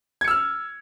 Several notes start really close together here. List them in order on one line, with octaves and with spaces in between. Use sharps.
G#6 C#7 E6 F6